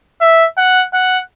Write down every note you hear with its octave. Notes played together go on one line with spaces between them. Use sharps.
E5
F#5
F#5